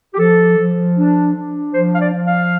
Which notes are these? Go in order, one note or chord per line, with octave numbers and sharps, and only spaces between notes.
G4
F3 A4
F3
D4
D4
F3 C5
F5
D5
F3
F5